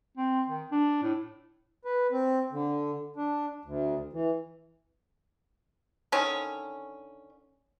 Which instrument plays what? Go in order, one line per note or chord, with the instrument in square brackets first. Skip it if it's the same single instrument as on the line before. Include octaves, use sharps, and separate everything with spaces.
[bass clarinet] C4
D#3
D4
A2
[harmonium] B4
C4
D3
D4
D2
E3
[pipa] D3 D#3 C#4